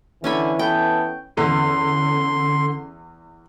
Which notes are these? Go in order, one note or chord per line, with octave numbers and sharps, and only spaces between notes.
D3 E3 C#4 G#5 B5
B3 A4 G5
E2 D3 C#4 C6